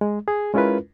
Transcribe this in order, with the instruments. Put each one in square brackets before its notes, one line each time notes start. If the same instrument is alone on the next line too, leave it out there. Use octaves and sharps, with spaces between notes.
[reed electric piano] G#3
G#4
G#3 C#4 E4 F4 A#4 B4